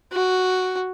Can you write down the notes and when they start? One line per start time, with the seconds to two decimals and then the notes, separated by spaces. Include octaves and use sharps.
0.13 F#4